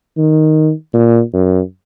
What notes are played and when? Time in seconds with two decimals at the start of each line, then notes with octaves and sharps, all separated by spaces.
0.17 D#3
0.94 A#2
1.33 F#2